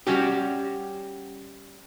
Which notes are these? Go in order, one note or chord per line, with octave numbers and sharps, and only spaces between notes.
G3 C#4 F#4 G4